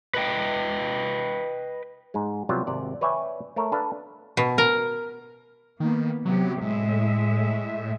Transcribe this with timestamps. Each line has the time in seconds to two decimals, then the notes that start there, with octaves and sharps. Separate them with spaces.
0.14 B4 D#5 G5
2.14 G#2 G#3
2.49 C3 F#3 G3 B3 F4 G4
2.67 G#1 C3 D5
3.01 B4 C#5 D5 E5 G5 G#5
3.56 A3 A4 A#4 C#5
3.72 D4 A4 B4 F5
4.37 B2
4.58 A#4
5.80 D#3 A#3 B3
6.25 C3 F#3 B3 G4
6.61 A2 G#3 E5